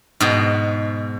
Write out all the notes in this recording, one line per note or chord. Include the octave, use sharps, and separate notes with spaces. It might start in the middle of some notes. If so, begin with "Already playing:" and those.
G#2 B2